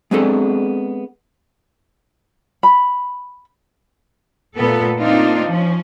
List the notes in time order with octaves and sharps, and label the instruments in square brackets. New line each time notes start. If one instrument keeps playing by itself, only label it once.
[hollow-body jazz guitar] G#3 B3 C4 D4 G#4 A4
[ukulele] B5
[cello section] A#2 A3 B3 A4
A#3 C4 D4 D#4 F4
F3 C#4